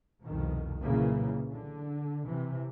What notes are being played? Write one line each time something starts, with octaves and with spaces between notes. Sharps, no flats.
C2 F2 B2 D#3
A#2 C#3 E3 F#3 A#3
D3
C3 E3